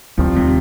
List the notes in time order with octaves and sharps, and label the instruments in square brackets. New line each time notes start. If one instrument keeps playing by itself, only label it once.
[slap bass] D#2 D#3 G3 C4 [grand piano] F3
[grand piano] C3